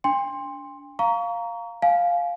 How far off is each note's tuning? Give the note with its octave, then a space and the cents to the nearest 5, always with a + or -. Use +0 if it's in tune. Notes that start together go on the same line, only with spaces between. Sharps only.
D4 -30 G5 +40 C6 +10
F5 +0 A#5 +0 C#6 +30
F5 +0 G#5 +35